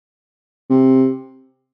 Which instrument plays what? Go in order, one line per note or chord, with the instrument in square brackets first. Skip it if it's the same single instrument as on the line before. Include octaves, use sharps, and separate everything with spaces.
[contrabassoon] C3